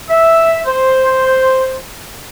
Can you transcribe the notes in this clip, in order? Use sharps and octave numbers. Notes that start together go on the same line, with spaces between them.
E5
C5